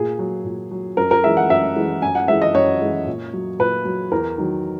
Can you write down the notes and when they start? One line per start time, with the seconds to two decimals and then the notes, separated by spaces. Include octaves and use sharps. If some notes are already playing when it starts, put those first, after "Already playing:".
Already playing: A#2 G#4
0.19 F#3
0.45 A#2
0.71 F#3
0.97 F#2 A#4
1.11 A#4
1.24 E3 G#3 E5
1.37 F#5
1.49 F#2 E5
1.76 E3 G#3
2.02 F#2 G#5
2.15 F#5
2.28 E3 G#3 E5
2.42 D#5
2.54 F#2 C#5
2.81 E3 G#3
3.06 A#2
3.33 F#3
3.59 A#2 B4
3.85 F#3
4.12 E2 A#4
4.38 D#3 F#3